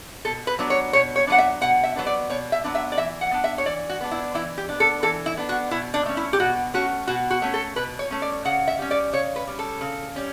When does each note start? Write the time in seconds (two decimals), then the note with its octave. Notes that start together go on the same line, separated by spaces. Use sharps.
0.25 B2 A4
0.47 B4
0.59 F#3 B3 D4
0.70 C#5
0.93 B2 C#5
1.16 C#5
1.27 F#3 B3 D4 F#5
1.38 E5
1.61 B2 F#5
1.83 E5
1.96 F#3 B3 D4
2.06 D5
2.30 B2 C#5
2.52 E5
2.64 F#3 B3 D4
2.75 E5
2.92 D5
2.98 E3 E5
3.21 F#5
3.32 B3 D4
3.44 E5
3.58 C#5
3.66 E3 D5
3.89 F#4
4.01 B3 D4
4.11 E4
4.34 E3 E4
4.58 G4
4.69 B3 D4
4.80 A4
5.03 E3 A4
5.26 E4
5.37 B3 D4
5.49 F#4
5.71 B2 E4
5.94 D4
6.06 A3 C#4
6.17 E4
6.33 G4
6.40 B2 F#4
6.74 A3 C#4 F#4
7.07 B2 F#4
7.30 F#4
7.42 A3 C#4
7.54 A4
7.76 B2 B4
7.99 C#5
8.11 A3 C#4
8.22 D5
8.45 C#3 F#5
8.68 E5
8.79 G3 C#4
8.91 D5
9.13 C#3 C#5
9.36 B4
9.47 G3 C#4
9.59 A4
9.81 C#3
10.16 G3 C#4